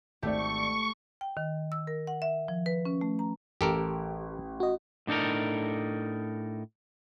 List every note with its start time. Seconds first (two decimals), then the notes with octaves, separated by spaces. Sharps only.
0.22 G#1 A3 G4 D5 C#6
1.21 G5
1.37 D#3
1.72 E6
1.87 A#4
2.07 F#5
2.22 E5
2.48 F3
2.66 B4
2.85 C#4
3.01 A3
3.19 A#5
3.61 A1 G4 A4 A#4
4.60 F#4 D#5
5.07 A2 D4 D#4 A4 A#4